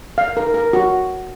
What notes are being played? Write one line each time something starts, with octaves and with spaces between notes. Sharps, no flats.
F5
A#4
A#4
F#4